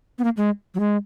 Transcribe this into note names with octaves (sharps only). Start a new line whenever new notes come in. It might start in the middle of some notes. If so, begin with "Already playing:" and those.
B3
A#3
G#3
F#3
G#3